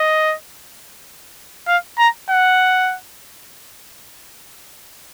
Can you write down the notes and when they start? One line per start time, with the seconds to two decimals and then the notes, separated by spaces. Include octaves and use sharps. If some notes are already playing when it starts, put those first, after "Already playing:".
Already playing: D#5
1.68 F5
1.98 A#5
2.30 F#5